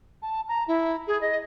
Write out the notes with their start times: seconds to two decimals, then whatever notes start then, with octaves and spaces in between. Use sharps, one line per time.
0.22 A5
0.49 A#5
0.68 E4
1.07 G#4
1.21 D#5